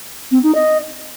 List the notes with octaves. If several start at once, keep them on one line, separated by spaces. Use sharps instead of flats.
C4
D#4
D#5